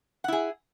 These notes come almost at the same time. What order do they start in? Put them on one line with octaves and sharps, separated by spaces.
F#5 E4 G#4